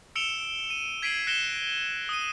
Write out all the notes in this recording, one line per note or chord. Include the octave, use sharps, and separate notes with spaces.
E6 C#7 D7 E7 F7 G7
D#7
G#6 B6 C7 D7 D#7 F#7
F#6 A#6 C#7 D7 E7 G7
D#6 D#7